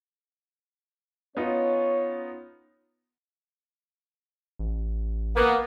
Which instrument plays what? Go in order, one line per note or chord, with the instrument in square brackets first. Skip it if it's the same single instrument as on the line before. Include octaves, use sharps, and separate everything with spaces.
[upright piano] B3 D#4 F4 [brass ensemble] C#4 C#5
[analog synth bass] A1
[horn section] A#3 B3